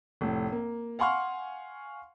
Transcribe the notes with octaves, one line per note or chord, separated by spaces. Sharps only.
F1 A2
A#3
F5 F#5 G#5 C6 C#6 F6